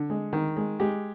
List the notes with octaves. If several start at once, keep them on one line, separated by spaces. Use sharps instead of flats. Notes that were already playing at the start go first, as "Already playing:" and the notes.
Already playing: D3
G#3
D#3
G#3
G#3 G4